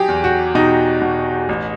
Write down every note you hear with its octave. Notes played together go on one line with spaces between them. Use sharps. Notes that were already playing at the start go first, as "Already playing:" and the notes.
Already playing: F#3 G4 G#4
E2
F#4
B2 D#4
B2
A1